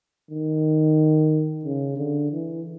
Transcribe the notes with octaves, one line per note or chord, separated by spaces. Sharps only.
D#3
C#3
D3
E3